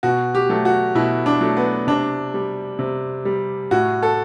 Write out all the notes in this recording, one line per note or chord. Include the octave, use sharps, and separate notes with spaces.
B2 F#4
G4
F#3 A3
F#4
B2 E4
D4
F#3 A3
B3
C3 D4
G3
C3
G3
A2 F#4
A4